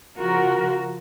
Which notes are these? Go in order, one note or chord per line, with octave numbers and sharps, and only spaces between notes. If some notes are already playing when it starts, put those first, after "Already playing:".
C#3 F3 F4 F#4 A#4